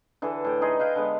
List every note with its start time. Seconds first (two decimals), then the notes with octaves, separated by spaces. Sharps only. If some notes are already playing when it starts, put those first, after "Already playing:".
0.22 D3 E3 G#4 A4
0.45 A2 G5
0.61 D#4 G#4 D#5 C6
0.79 D#4 B4 F5 G5
0.96 D3 G#3 B3